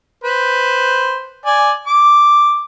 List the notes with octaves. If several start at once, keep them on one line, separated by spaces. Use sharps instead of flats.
B4 C5
D5 G#5
D6